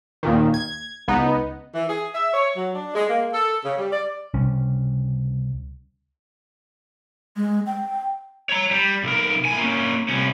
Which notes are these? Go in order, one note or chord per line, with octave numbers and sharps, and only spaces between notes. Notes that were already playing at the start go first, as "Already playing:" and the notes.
D#2 A#2 D#3
G#6
C#2 B3 D#4
E3
G#4
E5
C#5
F#3
D4
G#3
A#3
A4
C#3
G3
D5
C#2 C3 G3 C#4
G#3
G5
C#5 A#5
G3
B1 A#4
A2 G#5
A#3 C#4
C2 C#4